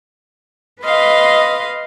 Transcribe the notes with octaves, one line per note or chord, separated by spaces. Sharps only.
B4 D#5 F5 C6